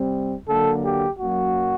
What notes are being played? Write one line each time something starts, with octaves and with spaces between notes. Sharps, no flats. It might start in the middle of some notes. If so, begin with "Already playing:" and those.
Already playing: C3 G3 C4
D3 F#3 A#3 A4
G4
F#2 F#3 A#3 F#4